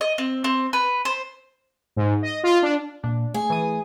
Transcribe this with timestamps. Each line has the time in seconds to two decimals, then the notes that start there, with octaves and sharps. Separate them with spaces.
0.01 D#5
0.18 C4
0.44 C4
0.73 B4
1.05 C5
1.96 G#2
2.23 D#5
2.44 F4
2.62 D4
3.03 A#2 D4
3.34 A3 G#4
3.50 E3 D#6